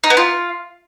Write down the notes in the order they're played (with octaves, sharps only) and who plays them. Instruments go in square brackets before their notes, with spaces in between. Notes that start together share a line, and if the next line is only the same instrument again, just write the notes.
[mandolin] D#4
B3
F4